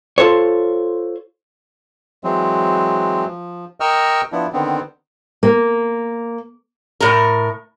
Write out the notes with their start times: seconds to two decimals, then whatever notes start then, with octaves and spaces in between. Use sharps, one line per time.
0.18 F4 A4 C5 C#5
2.24 E3 F#3 G#3 C4
3.27 F3
3.80 A#4 D#5 G5 C#6 E6 F6
4.32 F3 B3 D4 E4
4.53 D3 D#3 B3 C4
5.43 A#3
7.01 A2 A#4